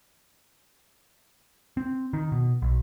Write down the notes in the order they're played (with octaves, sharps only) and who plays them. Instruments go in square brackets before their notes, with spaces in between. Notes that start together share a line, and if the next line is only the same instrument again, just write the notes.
[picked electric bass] C4
D#3
B2
B1